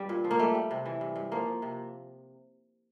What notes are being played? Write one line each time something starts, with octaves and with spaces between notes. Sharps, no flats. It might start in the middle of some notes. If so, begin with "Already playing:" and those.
Already playing: G2 G3
A#2
F3
A#3
G3 A3
G3
C3
E3
G2
G2
F3 A#3
F3
C3